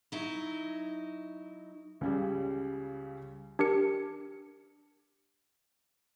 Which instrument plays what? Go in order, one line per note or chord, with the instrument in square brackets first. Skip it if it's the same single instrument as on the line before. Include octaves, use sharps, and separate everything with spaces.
[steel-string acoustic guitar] F#3 D#4 E4
[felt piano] C#2 C#3 G3
[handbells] D4 G4 A#4 C#7